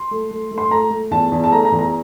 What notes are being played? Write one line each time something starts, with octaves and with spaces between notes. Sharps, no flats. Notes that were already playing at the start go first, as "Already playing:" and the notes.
Already playing: C6
A3
A3
A3
C6
A3 A#5
A3
E2 A5
E2
A5
A3 A#5
A#5
E2
A#5